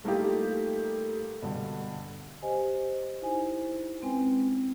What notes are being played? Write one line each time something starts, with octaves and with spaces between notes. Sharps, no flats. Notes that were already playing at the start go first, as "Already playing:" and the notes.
G3 A3 A#3 D#4 F4 G4
G2 B2 D3
G4 C5 D#5 G#5
D#4 E4 C5 G#5
G#3 C4 C#4 B4 G5 G#5